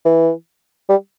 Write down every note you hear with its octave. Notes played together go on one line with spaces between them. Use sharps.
E3
G3